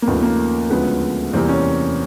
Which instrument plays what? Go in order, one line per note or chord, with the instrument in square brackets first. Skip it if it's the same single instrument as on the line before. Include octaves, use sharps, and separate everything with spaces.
[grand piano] A#3
D#2 C#3 F3 A3 B3
A#3
D2 C#3 F3 G#3 B3
E2 C3 E3 G3 A#3 C4
C#4